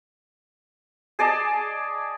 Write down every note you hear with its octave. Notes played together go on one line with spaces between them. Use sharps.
G#4 D5 D#5 A5